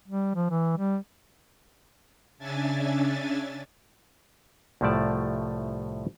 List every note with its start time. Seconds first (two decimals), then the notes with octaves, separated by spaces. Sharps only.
0.08 G3
0.35 F3
0.51 E3
0.78 G3
2.38 C#3 C#4 D4 E5 G#5 A6
4.81 C2 A2 F3 A3 D5 A5